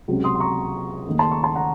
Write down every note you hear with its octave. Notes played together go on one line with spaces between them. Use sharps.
C#2 C3 F#3
C6 D#6
C6
A#5 C#6
D#2 D#3 A3
A5 C6
A#5 C#6
A5 C6
F#5 A#5